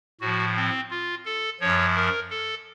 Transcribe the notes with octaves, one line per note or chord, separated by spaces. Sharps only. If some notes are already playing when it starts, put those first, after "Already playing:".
A2 F3 F#4
C4
F4
A4
F#2 F3 C#5
A#4
A4